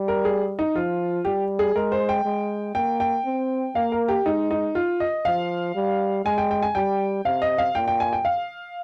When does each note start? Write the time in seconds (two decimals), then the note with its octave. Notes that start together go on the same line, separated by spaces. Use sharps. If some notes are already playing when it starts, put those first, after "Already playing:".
Already playing: G3
0.08 A#4
0.25 G#4
0.59 D#4
0.75 F3 F4
1.25 G3 G4
1.59 G#4
1.75 G#3 A#4
1.92 C5
2.09 G5
2.25 G#3
2.75 A#3 G5
3.00 G5
3.25 C4
3.75 A#3 F5
3.92 A#4
4.08 G4
4.25 G#3 D#4
4.51 D#4
4.75 F4
5.00 D#5
5.25 F3 F5
5.75 G3
6.25 G#3 G#5
6.38 G5
6.51 G5
6.62 G#5
6.75 G3 G5
7.25 C3 F5
7.42 D#5
7.58 F5
7.75 A#2 G5
7.88 G5
8.00 G#5
8.13 G5
8.25 F5